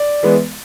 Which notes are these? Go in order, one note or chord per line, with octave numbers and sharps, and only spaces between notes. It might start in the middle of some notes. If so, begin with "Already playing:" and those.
Already playing: D5
E3 G#3 B3